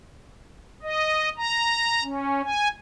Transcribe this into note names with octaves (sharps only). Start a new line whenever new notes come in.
D#5
A#5
C#4
G#5